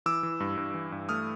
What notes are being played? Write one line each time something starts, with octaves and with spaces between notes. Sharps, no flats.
E3 D6 E6
E3
G2
G2
E3
G2
A3 D#6 F6